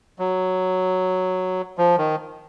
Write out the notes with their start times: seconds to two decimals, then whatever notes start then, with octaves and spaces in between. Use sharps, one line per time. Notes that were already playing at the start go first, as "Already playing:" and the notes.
0.19 F#3
1.78 F3
1.98 D#3